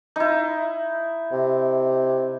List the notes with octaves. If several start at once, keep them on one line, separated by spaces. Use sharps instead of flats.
D#4 E4
C3